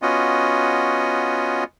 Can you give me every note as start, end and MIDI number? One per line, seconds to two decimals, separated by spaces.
0.02 1.64 59
0.02 1.64 61
0.02 1.64 65
0.02 1.64 66
0.02 1.64 75